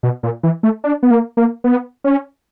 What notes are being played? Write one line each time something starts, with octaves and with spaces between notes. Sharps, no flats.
B2
A#2
E3
A3
D4
B3
A#3
A#3
B3
C#4